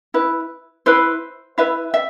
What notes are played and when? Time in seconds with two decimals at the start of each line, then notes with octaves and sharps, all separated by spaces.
0.14 E4 B4
0.86 E4 B4 C5
1.58 E4 B4 E5
1.94 E5